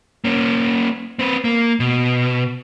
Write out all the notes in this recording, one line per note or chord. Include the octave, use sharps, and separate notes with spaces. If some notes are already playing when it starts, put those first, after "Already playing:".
A#3 C#4
C4 B4
A#3
B2